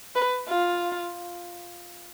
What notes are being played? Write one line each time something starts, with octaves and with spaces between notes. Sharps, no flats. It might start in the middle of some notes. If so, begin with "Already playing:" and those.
B4
F4